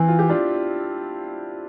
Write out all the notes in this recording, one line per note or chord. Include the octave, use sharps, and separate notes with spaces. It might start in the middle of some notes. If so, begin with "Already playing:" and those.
Already playing: E3 C4 E4
F4
G4
D4 F4